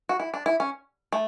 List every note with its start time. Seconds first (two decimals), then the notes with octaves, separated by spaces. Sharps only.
0.09 F#4
0.20 E4
0.34 D4
0.46 E4
0.60 C#4
1.12 A3